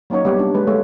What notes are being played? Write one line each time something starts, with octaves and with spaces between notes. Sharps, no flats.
F#3 A#3 C#4 D#4 C#5
G3 B3 G4
D4
G#3 B4
G#3 A3 A4 C#5